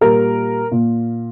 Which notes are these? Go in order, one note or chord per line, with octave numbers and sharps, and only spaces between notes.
A#2 G3 A#3 A#4
A#2